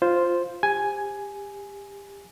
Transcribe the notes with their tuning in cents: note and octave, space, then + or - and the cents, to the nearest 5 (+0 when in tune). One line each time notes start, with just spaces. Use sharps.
F4 +0 C5 +0
G4 +25 G#5 +5